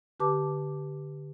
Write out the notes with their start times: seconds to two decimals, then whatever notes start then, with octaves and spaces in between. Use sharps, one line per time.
0.20 D3 G4 B4 A5 D6